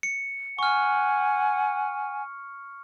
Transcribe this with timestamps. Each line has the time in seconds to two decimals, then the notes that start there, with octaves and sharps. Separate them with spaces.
0.03 C#7
0.59 F#5 G#5 C#6 F6